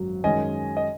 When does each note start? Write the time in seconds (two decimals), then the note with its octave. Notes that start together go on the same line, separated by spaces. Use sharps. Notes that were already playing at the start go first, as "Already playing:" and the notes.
Already playing: G#1 F#2 F#3
0.24 F#2 D#3 G#3 C#4 D#5 G#5
0.77 D#5